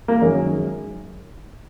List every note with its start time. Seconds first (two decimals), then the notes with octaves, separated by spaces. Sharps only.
0.08 A#3
0.21 F#2 D#3 G#3